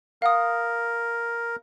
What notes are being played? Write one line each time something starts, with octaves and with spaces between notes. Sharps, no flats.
A#4 F5 F#5 D#6